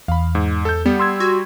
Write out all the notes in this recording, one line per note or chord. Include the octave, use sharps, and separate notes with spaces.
E2 F5 B5
G#2
A4 G6
G3 B3
C6 E6 G#6
F#4